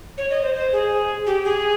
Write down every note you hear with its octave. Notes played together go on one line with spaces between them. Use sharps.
C#5
D#5
C5
C5
G#4
G4
G#4